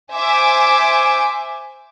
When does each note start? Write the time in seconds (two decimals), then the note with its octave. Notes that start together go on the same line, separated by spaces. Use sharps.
0.14 C5 E5 G#5 D6